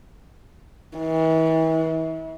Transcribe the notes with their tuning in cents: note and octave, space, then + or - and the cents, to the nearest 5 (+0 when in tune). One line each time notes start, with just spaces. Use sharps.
E3 -40